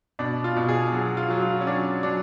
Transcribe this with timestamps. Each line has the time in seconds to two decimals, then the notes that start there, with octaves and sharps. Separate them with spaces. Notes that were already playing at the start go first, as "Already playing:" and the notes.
0.19 B2 D4
0.44 F4
0.56 B2
0.69 G#4
0.92 F#3 F#4
1.17 F4
1.30 F#3
1.42 F4
1.61 C#4
1.67 F#3 D4
2.03 F#3 D4